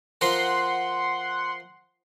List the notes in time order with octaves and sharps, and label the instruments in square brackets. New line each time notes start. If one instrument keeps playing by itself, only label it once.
[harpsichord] F3 A#4 [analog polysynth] F#5 C6